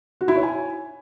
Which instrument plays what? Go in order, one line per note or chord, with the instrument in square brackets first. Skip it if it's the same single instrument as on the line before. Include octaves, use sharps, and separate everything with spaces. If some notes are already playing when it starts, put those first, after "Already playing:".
[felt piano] F#4
E4
C#5
G#5